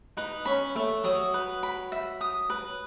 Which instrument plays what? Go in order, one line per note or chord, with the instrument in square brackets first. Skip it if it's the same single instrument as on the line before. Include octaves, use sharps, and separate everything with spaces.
[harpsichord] D#4 [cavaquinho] B4
[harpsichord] C#4 [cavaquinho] B5
[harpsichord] A3 [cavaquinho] E5
[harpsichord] F#3 [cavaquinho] D#6
[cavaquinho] B4
B5
E5
D#6
B4